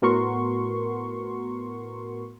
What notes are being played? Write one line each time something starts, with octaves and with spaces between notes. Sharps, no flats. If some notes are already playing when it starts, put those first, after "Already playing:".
A2 B3 F#4 A#4 C6 C#6